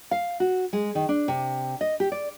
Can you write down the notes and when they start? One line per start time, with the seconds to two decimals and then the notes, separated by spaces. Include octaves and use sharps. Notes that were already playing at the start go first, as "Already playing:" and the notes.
0.11 F5
0.40 F#4
0.73 G#3
0.95 D#3
1.09 D4
1.28 C3
1.81 D#5
2.00 G4
2.12 D5